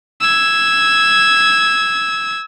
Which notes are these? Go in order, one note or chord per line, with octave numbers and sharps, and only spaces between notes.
E6 G#6